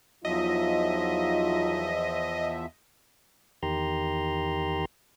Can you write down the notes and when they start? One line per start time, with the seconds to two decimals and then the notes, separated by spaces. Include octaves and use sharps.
0.25 E2 F3 F#3 D#4 F4 D#5 E5
3.63 E2 D#3 G4 A#5 C6